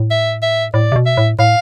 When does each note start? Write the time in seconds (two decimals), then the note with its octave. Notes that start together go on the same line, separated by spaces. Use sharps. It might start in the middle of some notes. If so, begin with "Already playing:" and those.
Already playing: A2
0.11 E5
0.42 E5
0.74 A2 D5
0.92 C3
0.96 B2
1.06 E5
1.17 A2
1.39 A2 F5